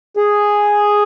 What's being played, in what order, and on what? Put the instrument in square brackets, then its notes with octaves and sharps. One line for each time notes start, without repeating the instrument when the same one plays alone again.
[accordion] G#4